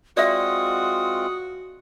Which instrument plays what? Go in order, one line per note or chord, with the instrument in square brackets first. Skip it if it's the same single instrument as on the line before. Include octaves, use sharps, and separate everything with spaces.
[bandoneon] G#3 C4 F4 [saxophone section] F#4 [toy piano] D5 E5 [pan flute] D#6